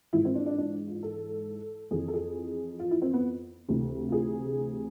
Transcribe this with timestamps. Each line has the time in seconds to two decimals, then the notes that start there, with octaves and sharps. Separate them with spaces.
0.13 G#2 E3 E4
0.25 C4
0.35 D4
0.46 D4
0.58 D4
0.87 F4
1.03 A4
1.91 F2 E3 G#4
2.08 A4
2.14 G#4
2.80 F4
2.91 E4
3.02 C4
3.13 B3
3.69 D2 C3 E3
4.09 F4
4.12 G#4